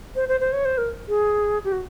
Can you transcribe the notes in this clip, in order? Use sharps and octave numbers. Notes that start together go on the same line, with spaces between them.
C5
C5
C5
C#5
C5
A#4
G#4
G4
F#4